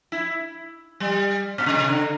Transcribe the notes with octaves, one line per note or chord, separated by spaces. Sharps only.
E4
G3
A#2
C3
D3